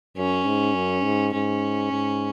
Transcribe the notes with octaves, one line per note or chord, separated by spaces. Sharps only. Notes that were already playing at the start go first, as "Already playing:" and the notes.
F#2 C#4
G#2
F#2
G#2
G#2 C#4
G#2